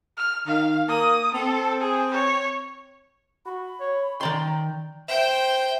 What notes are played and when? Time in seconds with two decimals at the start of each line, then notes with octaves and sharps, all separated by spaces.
0.17 F6
0.47 D#3 F5
0.89 A#3 D#6
1.34 C4 A4
1.81 G#4
2.12 C#5
3.46 F#4 B5
3.80 C#5
4.21 D#3 D5 G5 A#5 C6
5.08 C5 E5 G5